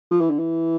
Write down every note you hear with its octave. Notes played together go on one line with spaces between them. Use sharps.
F3
E3
D3
E3